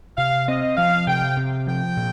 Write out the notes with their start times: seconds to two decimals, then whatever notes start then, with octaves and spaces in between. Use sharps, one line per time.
0.17 C3 F5
0.48 C4 D#5
0.77 F3 F5
1.07 C3 G5
1.37 C3
1.67 F3 G5
1.97 A#2